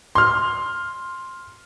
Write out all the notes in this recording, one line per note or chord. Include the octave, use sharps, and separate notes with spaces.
C6 F6